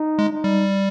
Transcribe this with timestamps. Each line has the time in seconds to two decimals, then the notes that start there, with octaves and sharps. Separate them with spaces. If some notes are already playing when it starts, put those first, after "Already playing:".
Already playing: D#4
0.19 G#3
0.32 D#4
0.44 G3